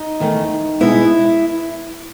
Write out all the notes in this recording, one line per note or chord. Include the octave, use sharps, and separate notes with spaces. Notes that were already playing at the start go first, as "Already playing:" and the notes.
Already playing: D#4
E2 D#3 A3
B2 G#3 B3 E4